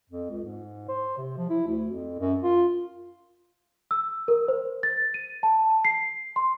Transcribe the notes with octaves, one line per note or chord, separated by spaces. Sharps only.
F2
C#2
G#2
C5
C3
F3
E4
D2
F2
F#2
F4
E6
A#4
C5
A6
D#7
A5
C7
C6